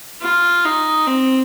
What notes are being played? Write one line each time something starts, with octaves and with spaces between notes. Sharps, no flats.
F4
D#4
C4